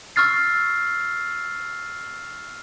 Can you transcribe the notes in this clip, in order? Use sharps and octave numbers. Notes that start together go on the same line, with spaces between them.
C#6 E6 F6 A6 C7